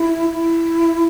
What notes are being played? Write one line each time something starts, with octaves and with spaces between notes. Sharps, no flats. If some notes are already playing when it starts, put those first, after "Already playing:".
Already playing: E4
E4